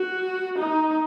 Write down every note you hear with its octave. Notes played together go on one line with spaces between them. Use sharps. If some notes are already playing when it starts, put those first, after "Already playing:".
Already playing: F#4
D#4